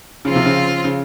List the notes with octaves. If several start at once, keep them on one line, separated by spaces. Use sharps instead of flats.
C#3 F3 C4 F4
C3
C#3
C#3